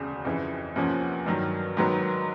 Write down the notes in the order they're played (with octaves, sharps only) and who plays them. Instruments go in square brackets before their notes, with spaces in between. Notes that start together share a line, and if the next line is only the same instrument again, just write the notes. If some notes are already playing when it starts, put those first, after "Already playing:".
Already playing: [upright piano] E1 D2 C#3
F2 C#3 E3
E2 C3 F3 A#3 C#4
G2 D#3 F#3
G#2 D#3 F#3 B3